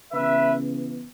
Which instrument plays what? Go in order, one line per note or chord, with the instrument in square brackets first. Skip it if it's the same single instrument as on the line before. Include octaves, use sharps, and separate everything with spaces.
[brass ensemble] C#3 E3 B3 B4 E5